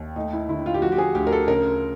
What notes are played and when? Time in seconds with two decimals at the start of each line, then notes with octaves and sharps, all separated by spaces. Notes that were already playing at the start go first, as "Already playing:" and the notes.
Already playing: D#2
0.16 A3 D#4
0.33 E4
0.48 D3 E4
0.66 F4
0.74 G4
0.82 F3 F#4
0.92 G4
0.98 G#4
1.15 D2 G4
1.27 A#4
1.32 A4
1.48 C#3 A#4